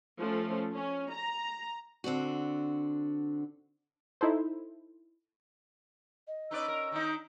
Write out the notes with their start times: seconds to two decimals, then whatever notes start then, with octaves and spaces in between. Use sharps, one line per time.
0.20 F3 A3 C#4
0.73 C#4
1.12 A#5
2.04 D3 C4 D4 F#4
4.21 D#4 E4 A4 C5
6.27 D#5
6.51 C#4 D#4 B4 D5 E6
6.68 A#4
6.92 D#3 D#4